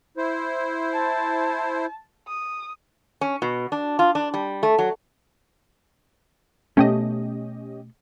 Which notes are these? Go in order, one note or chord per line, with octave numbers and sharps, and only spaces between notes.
E4 C5
A5
D#6
C#4
B2
D4
F4
D4
G3
A3
F#3
B2 A3 C#4 G4 D#5